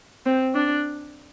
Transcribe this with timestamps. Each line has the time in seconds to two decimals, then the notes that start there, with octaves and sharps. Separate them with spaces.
0.26 C4
0.55 D4